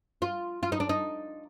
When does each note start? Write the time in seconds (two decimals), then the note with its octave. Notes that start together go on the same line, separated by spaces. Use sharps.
0.22 F4
0.63 F4
0.72 D#4
0.80 D4
0.89 D#4